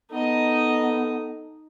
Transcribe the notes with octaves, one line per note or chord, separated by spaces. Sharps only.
B3 D#4 A4 D#5